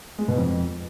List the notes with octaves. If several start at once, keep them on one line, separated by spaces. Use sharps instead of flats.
G#3
B2
F2